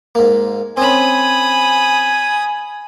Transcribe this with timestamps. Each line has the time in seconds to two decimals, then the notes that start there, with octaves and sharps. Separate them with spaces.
0.15 G#2 A#3
0.77 C4 C#4 G#5 B5 D#6